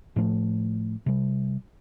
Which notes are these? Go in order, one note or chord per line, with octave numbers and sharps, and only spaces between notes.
A2 F3 A3
C3 G3